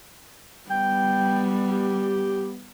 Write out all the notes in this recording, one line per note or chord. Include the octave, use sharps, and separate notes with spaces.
G3 B3 G5
G4